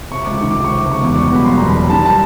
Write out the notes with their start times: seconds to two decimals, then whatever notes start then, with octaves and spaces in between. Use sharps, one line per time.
0.11 C3 C#6
0.25 C#2 D6
0.38 D#3 C#6
0.51 C#2 D6
0.64 C#6
0.71 C3
0.78 D6
0.85 C#2
0.92 C#6
1.01 E2 D6
1.16 G3 C#6
1.31 B2 B5
1.45 F#1 C6
1.57 E2 A#5
1.67 B5
1.75 G3
1.90 D#3 A5
2.05 A5